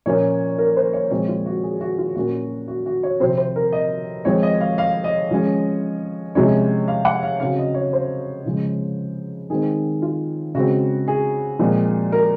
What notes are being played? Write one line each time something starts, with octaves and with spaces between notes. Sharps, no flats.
A#2 F3 A#3 C#4 C#5
A#4
C5
C#5
A#2 F3 G#3 C4 C#5
F4
F#4
G#4
F#4
F4
A#2 F#3 A#3 C#4 F#4
F#4
F#4
C#5
C3 F3 C4 C5
C5
A#4
D#5
F3 G#3 C4 C#5
D#5
F5
F5
D#5
F3 G#3 C#4
C3 F3 G#3 C#4 C#5
F5
F#5
F5
C#3 F#3 C4 F5
D#5
C#5
C5
C#3 F3 G#3
D#3 G#3 C4 G#4
F4
C#3 G#3 C4 F#4
G#4
A#2 F3 G#3 C4
A#4